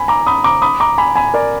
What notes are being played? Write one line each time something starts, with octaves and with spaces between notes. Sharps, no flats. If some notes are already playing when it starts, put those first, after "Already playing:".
Already playing: G#5 B5
A#5 D6
B5 D#6
A#5 D6
B5 D#6
A#5 D6
G#5 B5
G#5 B5
A#4 D5